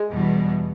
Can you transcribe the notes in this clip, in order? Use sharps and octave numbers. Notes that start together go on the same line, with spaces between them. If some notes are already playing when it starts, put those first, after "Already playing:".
Already playing: G#3
E2 B2 G3